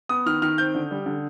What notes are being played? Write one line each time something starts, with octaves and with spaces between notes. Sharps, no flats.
B3 D#6
D#3 F6
D#3 F6
C4 G6
D3
G3
D3